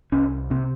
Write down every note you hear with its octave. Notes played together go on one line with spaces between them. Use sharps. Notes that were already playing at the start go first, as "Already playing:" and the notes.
C2 C#4
C3 C4